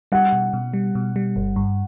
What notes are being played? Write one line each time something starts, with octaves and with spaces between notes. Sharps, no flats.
G3 F#5
B2
B2
G3
B2
G3
G1
G2